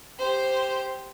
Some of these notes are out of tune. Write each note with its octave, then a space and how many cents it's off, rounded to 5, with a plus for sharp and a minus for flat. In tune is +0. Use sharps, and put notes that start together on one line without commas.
G4 +0 C5 +0